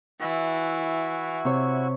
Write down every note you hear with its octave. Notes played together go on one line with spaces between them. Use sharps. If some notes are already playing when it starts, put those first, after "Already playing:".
E3 E4 F#4
C3 C#5 C#6